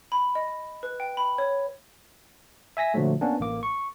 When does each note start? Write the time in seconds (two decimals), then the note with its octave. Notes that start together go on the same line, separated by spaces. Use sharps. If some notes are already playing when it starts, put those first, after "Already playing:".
0.12 B5
0.35 D#5
0.83 B4
1.00 G5
1.17 B5
1.38 C#5
2.77 E5 G#5 A#6 B6
2.94 A#2 D3 F3 F#3 A3
3.21 A#3 B3 C#4 D4
3.40 A1 A#3 D6
3.63 C#6